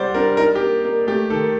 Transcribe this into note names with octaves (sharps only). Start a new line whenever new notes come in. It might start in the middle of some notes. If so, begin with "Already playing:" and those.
Already playing: G3 G4 C5 D5 F#5
D4 A#4
D#4 A#4
G4
A#3
A#3
A3 G4
D#3 A4